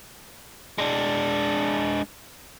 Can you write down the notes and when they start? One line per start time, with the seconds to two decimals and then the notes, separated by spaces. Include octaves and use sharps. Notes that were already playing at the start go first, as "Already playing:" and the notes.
0.78 G#3 D4